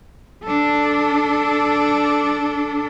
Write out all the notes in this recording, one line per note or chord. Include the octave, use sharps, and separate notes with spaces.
D4 A4